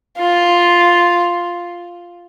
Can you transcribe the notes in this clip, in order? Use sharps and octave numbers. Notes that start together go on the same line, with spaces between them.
F4